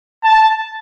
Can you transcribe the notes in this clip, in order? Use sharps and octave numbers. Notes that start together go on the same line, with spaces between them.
A5